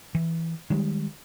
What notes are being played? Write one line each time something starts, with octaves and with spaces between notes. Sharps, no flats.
E3
D#3 G3 G#3